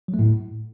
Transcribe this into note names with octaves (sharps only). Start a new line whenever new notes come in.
F#3
A3
A2